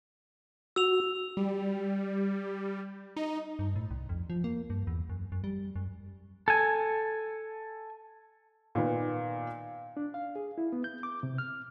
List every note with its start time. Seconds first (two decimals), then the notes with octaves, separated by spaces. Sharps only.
0.76 F#4 E6 F7
1.37 G3
3.16 D#4
3.59 G2
3.76 A2
3.91 C2
4.09 F2
4.30 F3
4.44 A#3
4.70 G2
4.87 E2
5.10 F#2
5.32 F#2
5.44 G3
5.76 F#2
6.48 A4 G#5
8.75 A#2 D#3 B3
9.97 D4
10.14 F5
10.36 G#4
10.58 E4
10.73 B3
10.84 G6
11.03 D6
11.23 C3
11.38 F6